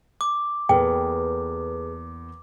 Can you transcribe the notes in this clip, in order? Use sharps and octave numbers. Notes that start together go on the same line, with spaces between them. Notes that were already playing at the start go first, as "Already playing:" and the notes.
D6
E2 A#3 G#4 A4 B4 G5